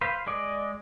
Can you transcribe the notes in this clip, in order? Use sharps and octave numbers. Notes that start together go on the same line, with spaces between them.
B4 C5 F5
G#3 D5 D#5